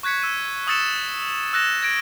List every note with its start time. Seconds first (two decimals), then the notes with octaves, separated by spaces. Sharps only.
0.03 C#6 F#6 G#6 B6 C#7
0.22 E6 D#7
0.67 C#6 D#6 E6 A6 C#7 E7
1.53 E6 F#6 A#6 E7
1.82 G#6 A#6 D7